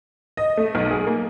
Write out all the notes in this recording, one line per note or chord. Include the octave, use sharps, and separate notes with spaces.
D#5
A3
B1
G#4
A#3